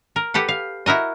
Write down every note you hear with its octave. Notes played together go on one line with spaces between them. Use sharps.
A#4
G4 A4 B4 F#5
F5
E4 F#4 A#4 D#5